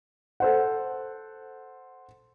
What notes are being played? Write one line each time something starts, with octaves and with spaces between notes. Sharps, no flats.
A4 C5 F#5